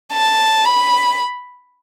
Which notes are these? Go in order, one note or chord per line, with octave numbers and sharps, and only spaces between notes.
A5
B5